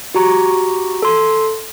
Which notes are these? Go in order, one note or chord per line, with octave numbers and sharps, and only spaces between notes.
F#4 G4 A#5 C#6
A4 C6